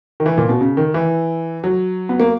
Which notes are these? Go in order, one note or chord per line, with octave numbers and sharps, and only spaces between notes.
D#3
E3
A#2
B2
C#3
D#3
E3
F#3
B3
A#3